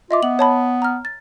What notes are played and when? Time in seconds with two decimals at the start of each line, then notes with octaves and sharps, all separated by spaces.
0.11 F4 D#5 E5 D6
0.23 B3 F#7
0.39 C#5 A5 B5
0.82 A#5 F6
1.05 A6